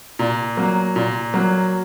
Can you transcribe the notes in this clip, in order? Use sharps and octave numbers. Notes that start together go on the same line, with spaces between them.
A#2
F#3 A#3
A#2
F#3 A#3